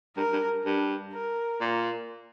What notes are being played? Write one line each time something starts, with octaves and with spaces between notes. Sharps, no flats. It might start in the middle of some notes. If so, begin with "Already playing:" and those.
G2 A#4
G2
G2
A#4
A#2